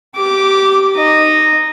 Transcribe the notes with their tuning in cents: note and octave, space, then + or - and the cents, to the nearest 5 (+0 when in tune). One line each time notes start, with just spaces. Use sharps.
G4 -15 D6 +0
D#4 -10 D#5 -10